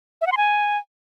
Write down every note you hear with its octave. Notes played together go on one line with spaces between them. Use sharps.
E5
F#5
C6
G#5